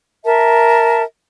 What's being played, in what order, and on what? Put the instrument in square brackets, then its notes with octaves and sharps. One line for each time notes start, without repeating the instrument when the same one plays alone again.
[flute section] A#4 E5 A5